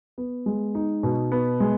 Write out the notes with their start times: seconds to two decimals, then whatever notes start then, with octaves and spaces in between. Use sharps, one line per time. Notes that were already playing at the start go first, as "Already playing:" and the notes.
0.18 B3
0.46 G#3
0.75 D#4
1.03 B2
1.32 B3
1.60 G#3